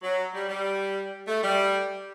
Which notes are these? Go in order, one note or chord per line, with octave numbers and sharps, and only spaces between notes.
F#3
G3
G3
A3
G3